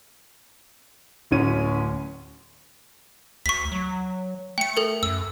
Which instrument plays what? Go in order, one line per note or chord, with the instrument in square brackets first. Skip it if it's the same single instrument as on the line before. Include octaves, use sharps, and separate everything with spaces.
[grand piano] D1 D2 C#4 D#7
[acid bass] D2 [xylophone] C#6 B6
[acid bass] F#3
[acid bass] A3 [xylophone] G5 C#7
[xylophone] A4 A#4
[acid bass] F#2 [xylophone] E6